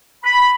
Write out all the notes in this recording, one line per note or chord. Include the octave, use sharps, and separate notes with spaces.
B5